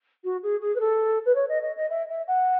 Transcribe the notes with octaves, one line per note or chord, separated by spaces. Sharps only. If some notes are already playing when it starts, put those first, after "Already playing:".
F#4
G#4
G#4
B4
A4
B4
C#5
D#5
D#5
D#5
E5
E5
F#5